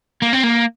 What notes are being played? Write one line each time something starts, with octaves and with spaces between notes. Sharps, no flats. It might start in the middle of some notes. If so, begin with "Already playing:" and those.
A#3
C4
A#3